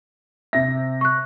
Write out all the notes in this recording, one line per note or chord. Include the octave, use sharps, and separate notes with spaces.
C3 E5 A#6
C#6 F#6